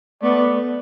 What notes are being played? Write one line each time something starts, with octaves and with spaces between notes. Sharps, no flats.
A3 B3 D5